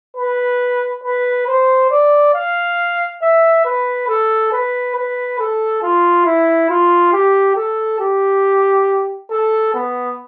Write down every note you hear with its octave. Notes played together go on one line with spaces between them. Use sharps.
B4
B4
C5
D5
F5
E5
B4
A4
B4
B4
A4
F4
E4
F4
G4
A4
G4
A4
B3